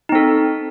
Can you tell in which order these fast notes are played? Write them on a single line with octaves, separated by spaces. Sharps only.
D#4 C4 A4